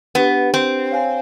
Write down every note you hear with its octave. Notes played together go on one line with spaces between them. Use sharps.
B3 D4 G4 B4
C4
C#5 F5 G#5